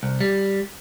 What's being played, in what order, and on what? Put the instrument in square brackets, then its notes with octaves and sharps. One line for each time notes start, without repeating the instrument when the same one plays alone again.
[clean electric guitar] C2
G3